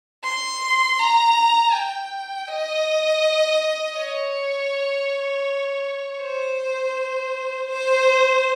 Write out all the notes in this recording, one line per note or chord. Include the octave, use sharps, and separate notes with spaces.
C6
A#5
G5
D#5
C#5
C5
C5